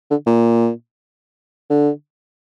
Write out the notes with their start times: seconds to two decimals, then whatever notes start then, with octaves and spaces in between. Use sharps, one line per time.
0.10 D3
0.26 A#2
1.70 D3